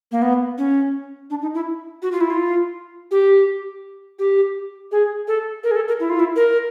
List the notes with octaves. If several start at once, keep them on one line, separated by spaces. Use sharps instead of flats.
A#3
B3
C#4
D4
D#4
E4
F#4
F4
E4
F4
G4
G4
G#4
A4
A#4
G#4
A4
A#4
E4
F4
E4
A#4